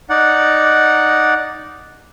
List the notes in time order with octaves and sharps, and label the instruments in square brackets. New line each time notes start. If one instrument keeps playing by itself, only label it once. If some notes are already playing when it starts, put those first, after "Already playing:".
[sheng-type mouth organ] D#4 D5 F#5